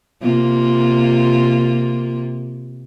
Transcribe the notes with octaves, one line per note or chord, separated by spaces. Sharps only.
C3 A#3 F4